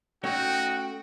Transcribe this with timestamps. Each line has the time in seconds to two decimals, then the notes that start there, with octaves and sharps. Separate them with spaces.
0.24 A3 C#4 D#4 F#4 C#5 G5